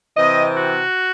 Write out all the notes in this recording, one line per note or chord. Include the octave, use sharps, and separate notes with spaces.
C3 E3 C4 D#5
F#4